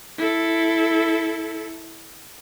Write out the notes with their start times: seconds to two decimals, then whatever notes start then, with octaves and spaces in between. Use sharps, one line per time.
0.18 E4 A4